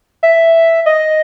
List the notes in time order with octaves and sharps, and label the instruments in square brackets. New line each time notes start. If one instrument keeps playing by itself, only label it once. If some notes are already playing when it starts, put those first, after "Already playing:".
[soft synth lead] E5
D#5